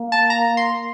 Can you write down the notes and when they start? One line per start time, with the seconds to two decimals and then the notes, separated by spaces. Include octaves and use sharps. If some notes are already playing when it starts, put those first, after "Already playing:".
Already playing: A#3
0.12 A5
0.30 A#5
0.57 C6